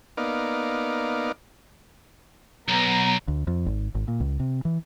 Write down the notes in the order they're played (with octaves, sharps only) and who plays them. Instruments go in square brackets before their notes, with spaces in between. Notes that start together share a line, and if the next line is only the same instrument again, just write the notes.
[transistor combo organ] A#3 B3 D#4 D5 F5
[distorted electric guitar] B1 [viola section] B3 A#5
[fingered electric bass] D2
F2
G#1
G#1
A#2
C#2
C3
E3